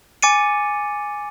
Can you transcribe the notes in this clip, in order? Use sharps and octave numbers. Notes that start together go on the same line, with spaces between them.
G#5 D6 A6 C#7 D#7